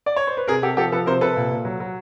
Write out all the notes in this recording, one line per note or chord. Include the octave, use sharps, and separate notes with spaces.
D5
C#5
C5
B4
C3 G#4 A#4
C3 G4 A4
F3 G4 A4
F3 A4 B4
C3 A#4 C5
C3 A4 B4
A#2
A#2
F#3
F#3